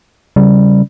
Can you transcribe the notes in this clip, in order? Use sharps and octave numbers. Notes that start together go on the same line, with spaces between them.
C#3 G3